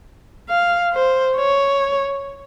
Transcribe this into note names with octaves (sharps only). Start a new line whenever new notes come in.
F5
C5
C#5